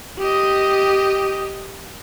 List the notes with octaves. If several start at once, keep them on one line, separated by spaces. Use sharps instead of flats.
G4 D#5